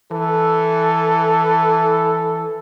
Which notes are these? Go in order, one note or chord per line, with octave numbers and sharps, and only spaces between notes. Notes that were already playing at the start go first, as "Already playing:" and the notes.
E3 A4